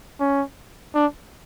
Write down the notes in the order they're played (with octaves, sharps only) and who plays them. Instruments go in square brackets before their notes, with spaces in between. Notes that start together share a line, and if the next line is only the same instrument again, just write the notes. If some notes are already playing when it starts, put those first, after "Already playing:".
[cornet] C#4
D4